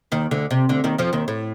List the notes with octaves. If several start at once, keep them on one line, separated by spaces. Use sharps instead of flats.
D#2 D#3
D2 D3
C3
D2 D3
D#2 D#3
F2 F3
D#2 D#3
A2